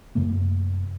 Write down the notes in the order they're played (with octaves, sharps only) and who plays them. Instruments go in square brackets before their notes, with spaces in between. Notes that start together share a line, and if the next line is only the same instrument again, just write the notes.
[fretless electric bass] F#2 C3 A3 A#3